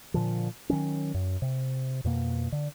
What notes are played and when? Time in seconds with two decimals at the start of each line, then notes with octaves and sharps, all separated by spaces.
0.14 A#2 D3 F3
0.70 D#3 F#3 C#4
1.14 F#2
1.42 C3
2.04 F2 B2 A#3
2.52 D3